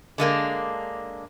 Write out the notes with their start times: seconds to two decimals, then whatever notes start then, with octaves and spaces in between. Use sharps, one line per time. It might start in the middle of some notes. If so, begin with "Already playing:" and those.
0.18 D3 G#3 A#3 D4